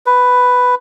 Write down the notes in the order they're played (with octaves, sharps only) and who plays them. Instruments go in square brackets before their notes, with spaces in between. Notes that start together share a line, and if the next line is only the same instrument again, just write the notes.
[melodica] B4